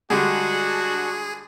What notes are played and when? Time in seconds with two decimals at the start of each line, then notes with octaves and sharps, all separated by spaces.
0.10 D3 G3 G#3 D4 F#4 G#4